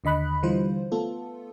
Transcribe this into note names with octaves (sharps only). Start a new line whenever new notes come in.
D#2 D3 D#5 B5 F#6
D3 E3 G3 F4 C5
A3 B3 F4 A4